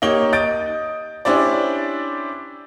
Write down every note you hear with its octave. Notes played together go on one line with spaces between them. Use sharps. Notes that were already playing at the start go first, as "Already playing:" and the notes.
A#3 D#4 G4 C#5 G7
D#5 D#6 G6 A6 D7
C#4 D4 E4 G4 C5 D5